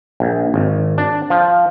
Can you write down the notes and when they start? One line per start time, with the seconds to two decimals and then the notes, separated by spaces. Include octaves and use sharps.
0.20 A#1
0.54 G#1
0.98 D4
1.30 F3